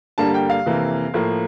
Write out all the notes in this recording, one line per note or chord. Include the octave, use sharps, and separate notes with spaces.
G2 D3 G3 A#3 A5
G5
F5
F2 C3 E3 A#3
A2 F3 A#3